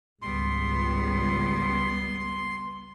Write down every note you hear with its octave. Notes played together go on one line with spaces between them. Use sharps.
G#1 C#2 G3 B3 C6